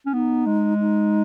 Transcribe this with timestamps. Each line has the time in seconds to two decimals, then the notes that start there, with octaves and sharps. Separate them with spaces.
0.06 C#4
0.13 B3 D#4
0.46 G#3
0.80 D#4